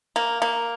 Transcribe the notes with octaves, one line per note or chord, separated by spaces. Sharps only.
A#3
A#3